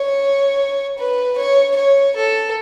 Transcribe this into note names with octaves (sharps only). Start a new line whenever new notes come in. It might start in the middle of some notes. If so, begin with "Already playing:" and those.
Already playing: C#5
B4
C#5
C#5
A4